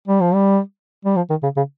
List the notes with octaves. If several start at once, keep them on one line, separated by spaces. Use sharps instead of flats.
G3
F3
G3
G3
F3
D#3
C#3
C#3